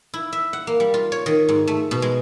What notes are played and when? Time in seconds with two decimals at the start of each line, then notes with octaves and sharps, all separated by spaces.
0.14 E4
0.33 E5
0.53 F#5
0.67 A#3
0.80 G3
0.94 F4
1.12 C#5
1.26 D#3
1.49 G#2
1.68 A3
1.91 B2
2.02 G#3